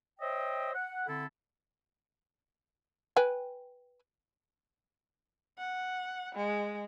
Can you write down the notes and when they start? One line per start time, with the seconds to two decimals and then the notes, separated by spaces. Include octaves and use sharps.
0.19 C5 C#5 D#5 E5 G5
0.74 F#5
1.06 D3 C4 E4 A4
3.16 B4 G5 G#5
5.58 F#5
6.35 G#3